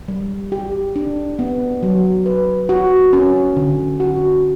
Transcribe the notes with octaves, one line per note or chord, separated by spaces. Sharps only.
G3
G4
D4
B3
F#3
B4
F#4
C#4
D3
F#4